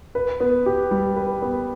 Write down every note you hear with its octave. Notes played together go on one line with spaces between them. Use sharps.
B4
B3
G4
G3
B4
B3